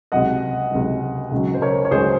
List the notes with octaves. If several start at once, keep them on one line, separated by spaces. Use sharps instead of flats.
C#2 C3 F#3 D#5 F#5
C#2 C3 F#3
C#2 C#3 F#3
C5
A#4 C#5
C#5
C#2 C#3 F#3 G#4 C5